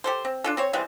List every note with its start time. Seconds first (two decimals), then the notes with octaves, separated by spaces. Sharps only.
0.04 G4 A4 C5
0.25 C4
0.44 D4 F4 A4
0.57 C4 C5 C#5
0.73 E3 G3 G#3 C4